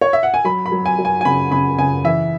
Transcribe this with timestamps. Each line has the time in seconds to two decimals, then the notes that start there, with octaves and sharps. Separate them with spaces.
0.01 C#5
0.13 E5
0.23 F#5
0.34 G#5
0.44 F#3 B5
0.66 B5
0.72 F#3
0.86 G#5
0.98 F#3
1.05 G#5
1.21 G#5
1.25 C#3 B5
1.51 C#3 B5
1.79 C#3 G#5
2.04 E3 E5